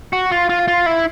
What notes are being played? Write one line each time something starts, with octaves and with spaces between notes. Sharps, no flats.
F#4
F4
F4
F4
E4